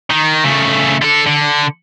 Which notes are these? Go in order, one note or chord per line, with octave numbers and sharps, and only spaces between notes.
D#3
C#3 A3
D3 A4
D3